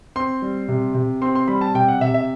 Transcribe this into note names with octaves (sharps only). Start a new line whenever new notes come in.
C4 C6
G3
C3
C3
C4 C6
C6
G3 B5
A5
C3 G5
F#5
C3 E5
E5